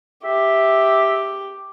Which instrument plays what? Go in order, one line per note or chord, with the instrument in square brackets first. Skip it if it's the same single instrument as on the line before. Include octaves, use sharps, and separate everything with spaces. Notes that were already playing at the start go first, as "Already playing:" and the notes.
[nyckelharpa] G4 [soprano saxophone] E5